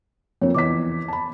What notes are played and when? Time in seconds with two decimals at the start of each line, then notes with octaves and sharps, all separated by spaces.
0.42 F2 A#3 C4 C#5
0.55 E2 D#5 D6 B6
1.08 A5 B5